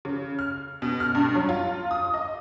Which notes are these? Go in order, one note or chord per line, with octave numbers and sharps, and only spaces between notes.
C#3
F6
B2
F6
G2
F#3
F4
D#6
D#5